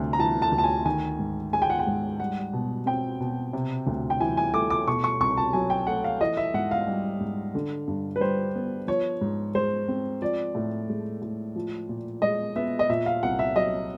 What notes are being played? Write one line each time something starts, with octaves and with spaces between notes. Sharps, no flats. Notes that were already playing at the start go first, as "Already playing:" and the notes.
Already playing: D2 C3
A#5
E3 A5
A5
D2
A5
G#5
D#3 G#5
G#2
G#3 G#5
G5
F#5
G5
G#2
G3 F#5
B2
C4 G5
B2
C3
D2
G5
E3 G#5
G#5
A3 D6
D6
B2 C#6
C#6
C2 C#6
A5
F#3 G#5
G5
A3 F#5
F5
E3 D#5
E5
G#2 F#5
F5
G3
G#2
D3
G2
B4
G3 C5
B3
F3 C#5
G#2
G#3 C5
C4
F3 D5
A2
G#3
A2
F3
A#2
G#3 D#5
B3 E5
D#5
A#2 E5
F5
C2 F#5
E5
F#3 D#5